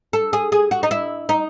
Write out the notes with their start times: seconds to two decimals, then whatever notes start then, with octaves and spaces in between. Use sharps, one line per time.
0.13 A4
0.33 G#4
0.52 G#4
0.71 F#4
0.83 D#4
0.91 E4
1.29 D#4